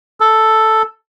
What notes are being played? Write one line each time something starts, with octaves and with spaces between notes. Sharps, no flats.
A4